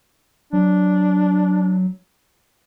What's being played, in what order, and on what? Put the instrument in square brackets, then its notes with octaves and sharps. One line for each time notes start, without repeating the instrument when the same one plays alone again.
[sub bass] F#3 [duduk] D4